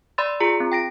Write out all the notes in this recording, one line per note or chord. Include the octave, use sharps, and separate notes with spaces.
D5 B5 C6 E6 A6
F4 G#4 A#5
C4
G5 A#6 D7